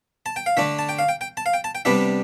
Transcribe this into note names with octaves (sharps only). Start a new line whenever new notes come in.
A5
G5
F5
D3 A3 D4 E5
A5
G5
F5
G5
G5
A5
F5
G5
A5
G5
C3 G3 B3 D4 E5